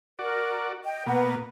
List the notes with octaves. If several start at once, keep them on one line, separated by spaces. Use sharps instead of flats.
F#4 A#4 D5
D#5 G5
B2 A#3 B4 F#5